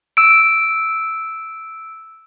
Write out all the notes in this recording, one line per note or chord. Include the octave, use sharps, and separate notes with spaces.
E6 D7